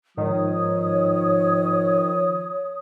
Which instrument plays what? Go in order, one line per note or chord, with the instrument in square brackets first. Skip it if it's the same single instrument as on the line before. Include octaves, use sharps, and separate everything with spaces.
[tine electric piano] G#2 [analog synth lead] D#3 [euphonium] F3 [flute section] C#5 D#6